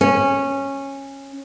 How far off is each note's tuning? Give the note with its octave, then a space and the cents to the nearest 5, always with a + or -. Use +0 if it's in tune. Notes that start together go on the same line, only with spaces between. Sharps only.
C#4 -15